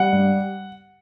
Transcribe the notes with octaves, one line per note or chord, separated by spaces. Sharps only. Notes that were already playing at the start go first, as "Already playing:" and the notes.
Already playing: G3 F#5
G2